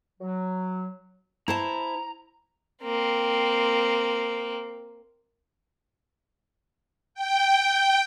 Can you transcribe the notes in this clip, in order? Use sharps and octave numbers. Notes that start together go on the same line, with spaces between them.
F#3
E4 C5 A5 A#5
A#3 C4
G5